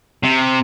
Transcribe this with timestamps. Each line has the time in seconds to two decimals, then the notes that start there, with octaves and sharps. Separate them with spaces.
0.24 C3